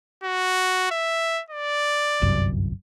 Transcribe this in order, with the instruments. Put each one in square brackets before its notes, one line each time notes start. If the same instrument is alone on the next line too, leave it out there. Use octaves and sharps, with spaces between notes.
[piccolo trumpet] F#4
E5
D5
[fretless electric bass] G1 C2 F#2